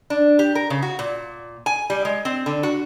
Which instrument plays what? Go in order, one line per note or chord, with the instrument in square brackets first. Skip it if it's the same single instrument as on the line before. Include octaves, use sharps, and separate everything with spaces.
[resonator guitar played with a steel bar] D4
G4
A#4
C#3
F#4
A#2
G#5
G3
G#3
C4
D3
F#4